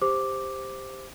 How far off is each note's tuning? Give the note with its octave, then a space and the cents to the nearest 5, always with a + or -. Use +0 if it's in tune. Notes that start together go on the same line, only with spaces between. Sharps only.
G4 +10 C5 +0 D6 +0